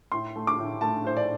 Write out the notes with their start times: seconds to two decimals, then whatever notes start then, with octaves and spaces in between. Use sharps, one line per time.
0.12 A2 C6
0.36 A3
0.47 D6
0.59 A2
0.81 A3 A5
1.04 A2 C5
1.17 D5